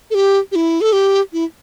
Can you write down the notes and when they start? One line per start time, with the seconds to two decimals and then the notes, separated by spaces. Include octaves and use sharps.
0.10 A4
0.15 G4
0.52 G4
0.55 E4
0.81 A4
0.93 G4
1.33 E4